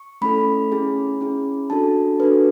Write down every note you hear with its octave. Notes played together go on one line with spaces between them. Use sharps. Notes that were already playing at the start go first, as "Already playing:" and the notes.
Already playing: C#6
A3 C#4 E4 A4 B5
C#4 E4 G#4
C#4 E4 G#4
D4 F#4 A4 A5
D4 F#4 A4 B4